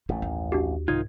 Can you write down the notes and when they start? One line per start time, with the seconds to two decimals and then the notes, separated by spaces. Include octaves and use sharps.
0.09 A1 F#2 A3
0.22 D#2
0.52 D4 F#4 G4
0.88 C2 G#2 D#3 D#4 F4 G#6